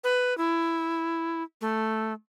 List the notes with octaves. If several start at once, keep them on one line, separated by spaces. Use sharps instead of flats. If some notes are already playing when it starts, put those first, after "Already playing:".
B4
E4
A3